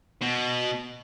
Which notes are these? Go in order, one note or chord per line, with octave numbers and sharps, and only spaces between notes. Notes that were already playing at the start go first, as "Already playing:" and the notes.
B2